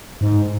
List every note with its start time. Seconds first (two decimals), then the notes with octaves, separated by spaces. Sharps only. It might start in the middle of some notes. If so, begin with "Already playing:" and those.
0.21 G#2